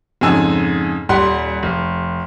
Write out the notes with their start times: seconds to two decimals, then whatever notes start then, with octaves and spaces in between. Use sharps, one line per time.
0.21 F2 G#2 C#3 G#5 E6
1.09 D#1 G3 F#5 C6
1.63 F1